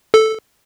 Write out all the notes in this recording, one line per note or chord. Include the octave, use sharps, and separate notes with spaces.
A4